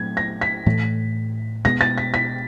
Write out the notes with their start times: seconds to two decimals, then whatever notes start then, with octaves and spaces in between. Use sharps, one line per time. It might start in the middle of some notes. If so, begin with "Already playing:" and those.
Already playing: A#2 F#3 A3 C4 G#6
0.17 A#6
0.41 B6
0.66 A2 E3 A3
1.65 B2 G#3 B3 A#6
1.81 A6
1.98 B6
2.14 B6